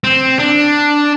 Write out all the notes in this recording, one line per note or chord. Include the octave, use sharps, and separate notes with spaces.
C4
D4